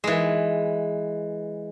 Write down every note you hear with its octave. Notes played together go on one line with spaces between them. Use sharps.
E3 G#3